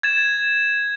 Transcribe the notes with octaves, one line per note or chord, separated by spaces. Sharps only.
G#6 A6 E7